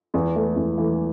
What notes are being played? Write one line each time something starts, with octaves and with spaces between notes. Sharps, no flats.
E2
E3 A3
E2
E3 A3